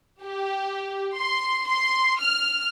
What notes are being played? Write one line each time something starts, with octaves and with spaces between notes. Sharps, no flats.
G4
C6
C6
F6